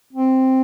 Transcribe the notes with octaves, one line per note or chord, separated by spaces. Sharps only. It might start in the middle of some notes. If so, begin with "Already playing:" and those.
C4